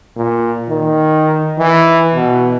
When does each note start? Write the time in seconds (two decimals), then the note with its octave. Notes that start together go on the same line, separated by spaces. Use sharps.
0.16 A#2
0.68 D#3
1.59 E3
2.15 B2